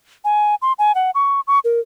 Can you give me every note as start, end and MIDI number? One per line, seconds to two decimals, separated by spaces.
0.24 0.55 80
0.62 0.73 84
0.79 0.94 80
0.95 1.11 78
1.15 1.40 85
1.47 1.59 85
1.64 1.80 70